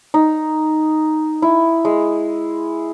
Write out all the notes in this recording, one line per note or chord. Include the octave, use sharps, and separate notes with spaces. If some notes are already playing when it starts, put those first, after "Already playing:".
D#4
E4
G#3